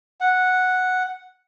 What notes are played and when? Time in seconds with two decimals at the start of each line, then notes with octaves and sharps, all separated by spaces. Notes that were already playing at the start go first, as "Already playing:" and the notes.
0.21 F#5